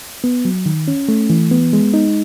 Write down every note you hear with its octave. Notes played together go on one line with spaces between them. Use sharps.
B3
F#3
D#3
C#4
A3
E3
B3
G#3
D#4